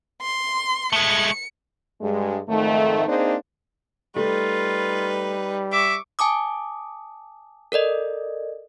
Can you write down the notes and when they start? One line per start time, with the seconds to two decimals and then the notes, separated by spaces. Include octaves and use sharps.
0.22 C6
0.93 G#3 A3 C#7
2.01 G2 G#3
2.48 F2 G#2 D#3 A3
3.07 A#3 C4 D4 D#4 G#4 C5
4.16 G3 A3 D#4 F4 B4
5.72 E5 C#6 D6
6.19 G#5 A5 D6 D#6
7.72 A4 A#4 D5 D#5